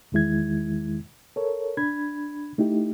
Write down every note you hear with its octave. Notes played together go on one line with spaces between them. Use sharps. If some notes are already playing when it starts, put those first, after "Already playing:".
E2 D#3 G#3 E4 G#6
A4 A#4 C#5
D4 B5 G#6
A3 D#4 E4 G4